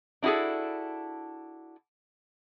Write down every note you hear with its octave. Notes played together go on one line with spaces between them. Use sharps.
D4 E4 F#4 G#4 A4